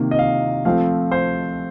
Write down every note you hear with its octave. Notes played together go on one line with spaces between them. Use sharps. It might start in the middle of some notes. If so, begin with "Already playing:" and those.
Already playing: C3 D#3 A#3
D#5
F5
F3 A3 C4 F5
C5